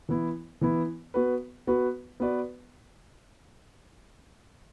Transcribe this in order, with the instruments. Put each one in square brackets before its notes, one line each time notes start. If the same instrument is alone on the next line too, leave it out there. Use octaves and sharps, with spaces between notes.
[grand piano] E3 B3 E4
E3 B3 E4
B3 F#4 B4
B3 F#4 B4
B3 F#4 B4 D5